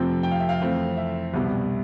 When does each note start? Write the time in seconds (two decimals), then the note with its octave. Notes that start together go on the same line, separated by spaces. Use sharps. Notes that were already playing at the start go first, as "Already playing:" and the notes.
Already playing: F2 C3 F3 A3 C4 G5
0.23 G5
0.31 F5
0.40 E5
0.49 F5
0.60 F2 E3 A3 C4
0.97 E5
1.34 C2 B2 G3 B3